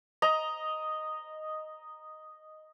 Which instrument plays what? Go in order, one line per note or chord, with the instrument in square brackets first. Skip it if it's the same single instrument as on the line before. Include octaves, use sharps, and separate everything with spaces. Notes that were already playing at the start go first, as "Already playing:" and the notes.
[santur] D#5 A#5